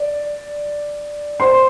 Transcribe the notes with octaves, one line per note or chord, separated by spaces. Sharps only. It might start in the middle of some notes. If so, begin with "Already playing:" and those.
Already playing: D5
C5 C6